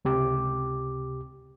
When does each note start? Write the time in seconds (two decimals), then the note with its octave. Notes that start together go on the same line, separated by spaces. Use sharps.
0.05 C#2 C3 G4 D6